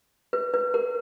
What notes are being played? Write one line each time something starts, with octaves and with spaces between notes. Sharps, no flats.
B4
B4
A#4